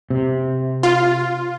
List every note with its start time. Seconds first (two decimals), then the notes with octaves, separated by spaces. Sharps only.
0.10 C3
0.83 F4